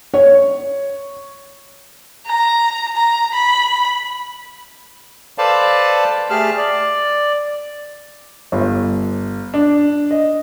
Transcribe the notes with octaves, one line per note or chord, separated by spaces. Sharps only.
C#5
A#5
A#5
B5
A4 B4 C5 D5 F5 A5
A3 G4 G#4 A5 F6
D5
G1
D4
D#5